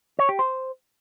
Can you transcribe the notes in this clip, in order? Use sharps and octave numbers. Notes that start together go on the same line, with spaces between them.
C#5
G4
C5